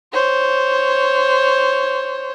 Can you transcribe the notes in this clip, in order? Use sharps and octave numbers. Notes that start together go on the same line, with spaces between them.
C5 C#5